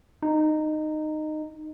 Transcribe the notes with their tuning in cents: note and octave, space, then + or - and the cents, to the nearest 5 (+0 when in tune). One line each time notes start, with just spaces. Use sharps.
D#4 -15